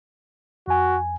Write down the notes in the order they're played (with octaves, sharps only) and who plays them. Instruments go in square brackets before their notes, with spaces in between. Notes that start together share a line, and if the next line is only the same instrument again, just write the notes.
[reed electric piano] F2 G#5 [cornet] F#4